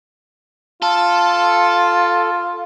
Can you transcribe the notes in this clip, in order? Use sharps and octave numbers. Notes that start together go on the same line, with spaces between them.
F4 A4